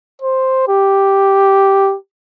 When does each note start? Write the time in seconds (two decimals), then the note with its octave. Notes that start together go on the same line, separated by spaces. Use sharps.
0.21 C5
0.68 G4